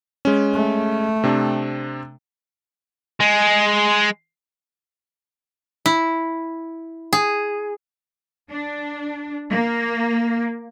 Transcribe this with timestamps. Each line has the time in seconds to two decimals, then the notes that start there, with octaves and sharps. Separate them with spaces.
0.25 G#3 C#4
0.54 A3
1.24 C3 C4 D4
3.21 G#3
5.86 E4
7.13 G#4
8.48 D4
9.50 A#3